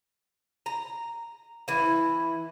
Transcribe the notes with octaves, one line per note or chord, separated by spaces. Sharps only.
A#5
E3 E4